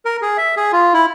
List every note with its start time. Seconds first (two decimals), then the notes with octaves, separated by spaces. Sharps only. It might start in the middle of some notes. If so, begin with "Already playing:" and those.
0.05 A#4
0.22 G#4
0.37 E5
0.57 G#4
0.72 F4
0.94 E4